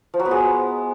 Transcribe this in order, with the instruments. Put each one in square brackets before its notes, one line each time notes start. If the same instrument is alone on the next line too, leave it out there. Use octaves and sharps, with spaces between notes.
[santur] F3
F#3
B3
G#3